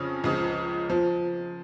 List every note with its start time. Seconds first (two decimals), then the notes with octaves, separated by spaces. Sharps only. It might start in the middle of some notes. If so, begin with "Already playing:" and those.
Already playing: F2 C#3 C#4
0.24 C#2 C#3 F3
0.90 F3